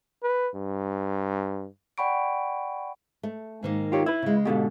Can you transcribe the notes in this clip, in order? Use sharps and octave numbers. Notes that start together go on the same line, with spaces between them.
B4
G2
D5 F#5 G5 B5 C#6 D7
A3
G#2 D#3 A#3
F4 G4 C#5
E4 B4
C#3 G#3
G#2 B2 D3 G4 A4 F5